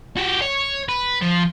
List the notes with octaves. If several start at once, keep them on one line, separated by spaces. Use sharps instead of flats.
F#4 G4
C#5
B4
F3